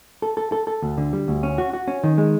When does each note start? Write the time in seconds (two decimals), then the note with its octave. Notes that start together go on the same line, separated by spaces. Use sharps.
0.22 A4
0.37 A4
0.52 A4
0.67 A4
0.82 D2
0.98 D3
1.13 G3
1.28 D2
1.43 C#4
1.58 F#4
1.73 F#4
1.88 C#4
2.04 D#3
2.18 G#3